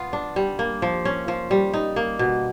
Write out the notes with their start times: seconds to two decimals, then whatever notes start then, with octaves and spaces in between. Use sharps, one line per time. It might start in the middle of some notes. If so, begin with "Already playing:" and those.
Already playing: B3 F4
0.13 D4
0.36 G3
0.59 A#3
0.82 F3
1.05 C#4
1.28 F3
1.51 G3
1.73 D#4
1.96 A#3
2.19 B2